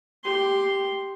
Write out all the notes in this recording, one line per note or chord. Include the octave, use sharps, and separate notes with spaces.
G4 C6